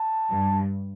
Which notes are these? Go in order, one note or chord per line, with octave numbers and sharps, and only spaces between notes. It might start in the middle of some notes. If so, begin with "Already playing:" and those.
Already playing: A5
G2